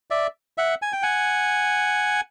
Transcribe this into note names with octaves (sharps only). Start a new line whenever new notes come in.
D5 E5
E5 F#5
G#5
G5
F#5 G#5